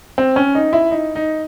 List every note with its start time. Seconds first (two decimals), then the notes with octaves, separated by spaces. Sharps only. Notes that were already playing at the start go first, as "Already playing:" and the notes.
0.18 C4
0.36 C#4
0.55 D#4
0.73 E4
0.91 D#4
1.15 D#4